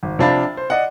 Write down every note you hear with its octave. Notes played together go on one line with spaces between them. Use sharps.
G#1
C3 F3 D4 F5 B5 A6
C5
D5 D#5 F#5